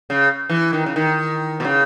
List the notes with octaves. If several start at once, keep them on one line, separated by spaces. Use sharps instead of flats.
C#3
E3
D#3
C#3
D#3
B2
C#3